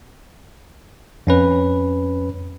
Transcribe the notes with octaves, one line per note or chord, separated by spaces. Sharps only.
F2 C#4 B4